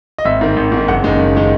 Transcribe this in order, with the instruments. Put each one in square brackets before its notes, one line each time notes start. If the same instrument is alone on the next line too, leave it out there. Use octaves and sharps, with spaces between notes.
[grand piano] D#5
G#1 E5
G#2 D#3
G#1
G#2
D#3
F#1 F#5
F#2 D#3 G#3
F#1
D#3 G#3